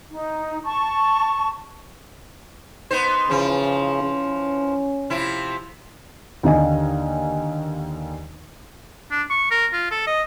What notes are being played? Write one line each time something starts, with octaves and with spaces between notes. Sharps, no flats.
D#4
A5 C#6
B3 D#4 C5
C#3 E3 F3
C#4
C3 F3 E4
D#2 D3 D#5 G#5
D4
C#6
A#4
F4
A4
D#5